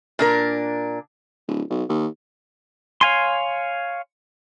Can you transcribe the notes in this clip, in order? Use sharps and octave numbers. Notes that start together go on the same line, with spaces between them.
A#2 D4 A#4
D1
B1
D#2
C#5 F5 G#5 C6